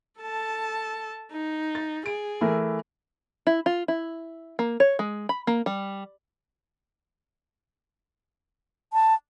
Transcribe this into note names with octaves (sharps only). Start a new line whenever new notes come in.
A4 A5
D#4
A6
G#4 D7
E3 A3 A#4
E4
F4
E4
A#3
C#5
G#3
B5
A#3
G3
A5